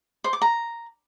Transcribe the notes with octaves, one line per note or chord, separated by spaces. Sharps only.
C5
D6
A#5